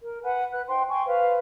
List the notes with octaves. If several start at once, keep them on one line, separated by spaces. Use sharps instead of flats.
A#4
B4 F#5 G#5
B4 F#6
D#4 C5 G5 C6
G5 G#5 C6 C#6
B4 C5 F5